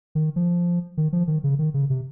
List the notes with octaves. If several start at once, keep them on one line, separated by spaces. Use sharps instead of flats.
D#3
F3
D#3
F3
D#3
C#3
D#3
C#3
C3